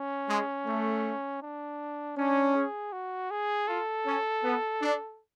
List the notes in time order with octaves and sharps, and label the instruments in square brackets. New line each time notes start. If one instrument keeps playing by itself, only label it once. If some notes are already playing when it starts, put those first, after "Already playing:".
Already playing: [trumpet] C#4
[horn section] G#3
A3
[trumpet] D4
[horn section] C#4 [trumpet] D4
[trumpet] G#4
F#4
G#4
[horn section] F4 [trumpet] A4
[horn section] C#4
B3
D4